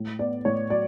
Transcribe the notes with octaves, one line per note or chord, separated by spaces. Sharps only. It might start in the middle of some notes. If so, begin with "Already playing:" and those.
Already playing: A2
B3 D5
A2 C#5
F#3 D5